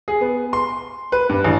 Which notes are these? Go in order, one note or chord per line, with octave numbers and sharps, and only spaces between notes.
G#4
B3
C6
B4
G2
A1